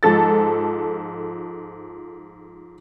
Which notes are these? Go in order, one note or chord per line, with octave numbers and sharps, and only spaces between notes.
G#2 F3 A4 A6